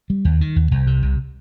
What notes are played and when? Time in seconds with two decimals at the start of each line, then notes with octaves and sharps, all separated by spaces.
0.10 G3
0.25 D#2
0.41 D#3
0.56 D#2
0.71 C2
0.87 C3
1.02 C2